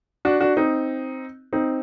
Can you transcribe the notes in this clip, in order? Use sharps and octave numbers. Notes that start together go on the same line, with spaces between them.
D4 F#4
D4 F#4
C4 D#4
C4 D#4